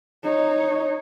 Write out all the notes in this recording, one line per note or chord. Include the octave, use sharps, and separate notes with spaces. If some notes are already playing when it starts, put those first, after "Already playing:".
D#4 C#5